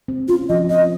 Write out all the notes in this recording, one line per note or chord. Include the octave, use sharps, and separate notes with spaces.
C4
C#4 F4
F3 D#5
C4 D#5